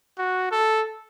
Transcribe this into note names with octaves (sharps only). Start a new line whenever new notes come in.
F#4
A4